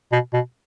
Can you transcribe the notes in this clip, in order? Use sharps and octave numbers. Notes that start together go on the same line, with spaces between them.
B2
B2